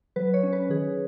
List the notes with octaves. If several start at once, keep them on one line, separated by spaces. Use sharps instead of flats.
F#3 B4
C#5
C#4
B4
D#3 G#4